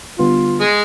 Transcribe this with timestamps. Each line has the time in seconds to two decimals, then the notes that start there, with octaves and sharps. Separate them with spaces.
0.19 D3 G3 B3 F4
0.61 G#3 G#4